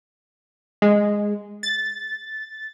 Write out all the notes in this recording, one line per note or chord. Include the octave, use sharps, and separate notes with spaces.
G#3
A6